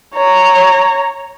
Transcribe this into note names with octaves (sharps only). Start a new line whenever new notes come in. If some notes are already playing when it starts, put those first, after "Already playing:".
C#5 A#5